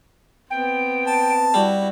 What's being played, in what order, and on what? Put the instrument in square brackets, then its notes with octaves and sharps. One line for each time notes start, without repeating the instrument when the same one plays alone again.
[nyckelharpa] B3 C4 [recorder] G5
[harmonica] A5
[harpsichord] G3 [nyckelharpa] E4 F#4